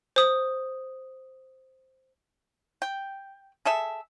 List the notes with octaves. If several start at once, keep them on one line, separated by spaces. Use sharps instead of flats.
C5 D#6
G5
G#4 A4 E5